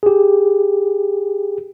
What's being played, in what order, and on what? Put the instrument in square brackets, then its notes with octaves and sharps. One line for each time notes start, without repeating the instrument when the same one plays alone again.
[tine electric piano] G4 G#4